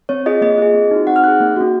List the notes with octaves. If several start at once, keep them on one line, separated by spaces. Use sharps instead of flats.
C4 C#5
F4 G#4 D#5
A#3 D#5
F4 G#4
C4
D#4 F#4
C4 F#5
F6
D#4 G#4 F#6
A#3
C#4 F#4